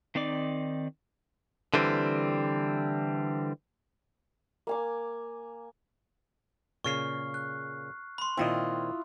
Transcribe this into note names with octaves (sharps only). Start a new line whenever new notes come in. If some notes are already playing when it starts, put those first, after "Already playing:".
D#3 C4 D#4 D5 D6
D3 E3 G3 C4
A#3 G#5 D6
A#2 C#3 C#6 F6 C7
F#6
B5 C6
A#2 D#3 C4 E4 F4 D#5